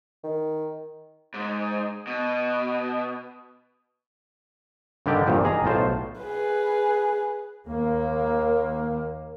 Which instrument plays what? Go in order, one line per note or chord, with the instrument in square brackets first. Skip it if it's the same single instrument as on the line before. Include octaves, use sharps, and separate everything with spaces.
[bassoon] D#3
[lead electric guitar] G#2
B2
[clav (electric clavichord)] G2 D3 D#3 G4 D5
E2 G2 A#2 F3
D#3 G#4 A#5
B1 A2 F4 C5 A5
[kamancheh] G#4 B4
[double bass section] D#2 A#3